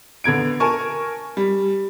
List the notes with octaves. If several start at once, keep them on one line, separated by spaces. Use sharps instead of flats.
D3 B3 G#6 D7
A#4 G#5 A5 C#6
G3